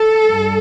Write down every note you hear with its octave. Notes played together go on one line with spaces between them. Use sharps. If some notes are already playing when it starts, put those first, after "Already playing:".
Already playing: A4
G2